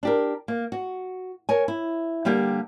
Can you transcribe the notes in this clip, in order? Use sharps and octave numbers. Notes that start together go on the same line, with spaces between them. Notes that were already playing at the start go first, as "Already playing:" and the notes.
D4 G4 A#4
A#3
F#4
A#4 C#5 G#5
E4
D3 G3 A#3 G4